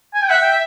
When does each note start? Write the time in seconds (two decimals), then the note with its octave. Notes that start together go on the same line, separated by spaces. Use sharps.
0.14 G#5
0.23 G5
0.30 E5 F#5
0.42 G5